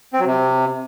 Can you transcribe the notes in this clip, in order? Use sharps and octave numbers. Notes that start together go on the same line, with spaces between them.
C4
F#3
C3